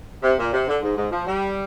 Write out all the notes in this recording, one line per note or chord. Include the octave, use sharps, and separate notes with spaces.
C3
A#2
C3
D3
G#2
G#2
F3
G3